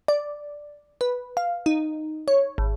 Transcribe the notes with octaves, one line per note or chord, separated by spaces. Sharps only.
D5
B4
F5
D#4
C#5
G#1